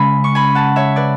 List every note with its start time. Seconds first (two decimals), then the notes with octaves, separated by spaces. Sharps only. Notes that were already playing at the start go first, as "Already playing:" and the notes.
Already playing: C#3 G#3 C#4 G#5 B5
0.24 C#6
0.35 G#5 B5
0.55 F#5 A5
0.76 C#5 E5
0.96 B4 D5